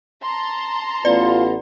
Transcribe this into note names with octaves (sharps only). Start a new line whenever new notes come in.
A5 A#5 C6
A1 B3 F4 D5